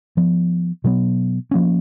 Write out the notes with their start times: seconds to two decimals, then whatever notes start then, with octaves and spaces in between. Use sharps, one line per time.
0.17 F3 B3
0.84 B2 F#3 B3
1.51 F3 A#3 C#4